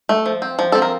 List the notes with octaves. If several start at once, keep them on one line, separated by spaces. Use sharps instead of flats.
A3
F3
C4
F3
C4 A4
A#4